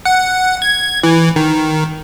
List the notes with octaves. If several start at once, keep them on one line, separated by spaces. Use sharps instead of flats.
F#5
G#6
E3
D#3